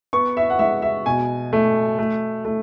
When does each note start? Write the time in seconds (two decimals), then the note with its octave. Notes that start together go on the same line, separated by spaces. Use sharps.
0.13 B3 C#6
0.37 E5
0.50 F#5
0.59 G#3 E5
0.82 E5
1.06 B2 G#5
1.53 A3
1.99 A3
2.45 A3